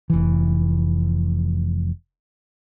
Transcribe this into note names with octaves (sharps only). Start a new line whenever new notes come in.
F1 E3